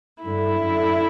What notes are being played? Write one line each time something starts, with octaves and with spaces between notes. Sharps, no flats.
G2 D3 E4
F#2 D3